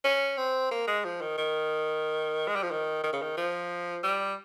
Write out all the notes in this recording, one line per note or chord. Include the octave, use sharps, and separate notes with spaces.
C#4
C4
A#3
G#3
F3
D#3
D#3
G#3
G3
F3
D#3
D#3
C#3
D#3
F3
G3